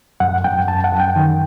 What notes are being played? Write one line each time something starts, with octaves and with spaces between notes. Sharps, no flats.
F#2 F#5
F#2 G5
F#2 A5
F#5
F#2
G5
D#3